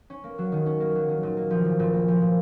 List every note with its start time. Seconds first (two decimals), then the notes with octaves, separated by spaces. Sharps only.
0.10 C#4
0.24 A#3
0.38 F#3
0.52 D#3
0.66 C#4
0.80 A#3
0.95 F#3
1.08 D#3
1.23 A#2
1.37 A#3
1.50 F3
1.65 A#2
1.79 A#2
1.93 A#3
2.08 F3
2.21 A#2